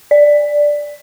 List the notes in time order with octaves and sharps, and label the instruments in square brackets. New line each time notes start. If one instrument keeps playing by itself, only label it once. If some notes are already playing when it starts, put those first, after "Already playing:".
[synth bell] D5